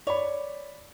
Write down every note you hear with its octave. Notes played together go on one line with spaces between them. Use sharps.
C#5 D5 B5